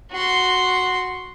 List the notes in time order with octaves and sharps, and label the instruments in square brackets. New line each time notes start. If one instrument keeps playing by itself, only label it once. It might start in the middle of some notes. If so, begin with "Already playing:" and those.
[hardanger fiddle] F#4 C6